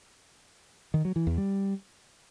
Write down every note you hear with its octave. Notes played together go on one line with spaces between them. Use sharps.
D#3
F#3
E3
E2
G3